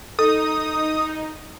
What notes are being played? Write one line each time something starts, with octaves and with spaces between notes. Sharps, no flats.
D#4 A4 D#6